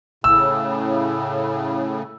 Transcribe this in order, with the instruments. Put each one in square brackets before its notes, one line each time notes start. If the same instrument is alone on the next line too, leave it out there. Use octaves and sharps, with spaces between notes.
[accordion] A2 C#3 [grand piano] E6